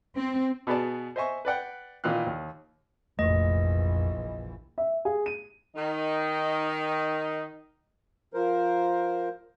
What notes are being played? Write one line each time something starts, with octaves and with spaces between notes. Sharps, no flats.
C4
B2 B3 G#4 D5 A5
C5 D#5 E5 G#5 C#6
B4 D5 F#5 G5
A#2 D#3 E3 F5 F#6
D#2
F1 A#1 F2 E3 A3 D#5
E5
G#4
D#7
D#3 D#4
F3 A#4 C5